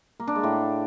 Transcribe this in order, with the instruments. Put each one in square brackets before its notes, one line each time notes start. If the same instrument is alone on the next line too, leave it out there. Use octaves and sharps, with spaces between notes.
[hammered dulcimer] A#3
D4
G#3
A2